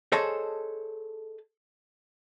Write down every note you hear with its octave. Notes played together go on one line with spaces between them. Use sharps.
G#4 A4 C5 C#5 D#5 A5